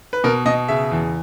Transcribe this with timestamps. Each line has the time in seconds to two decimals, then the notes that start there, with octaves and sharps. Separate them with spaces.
0.13 B4
0.24 B2 A#4
0.46 B2 D#5
0.69 C#3 E5
0.91 E2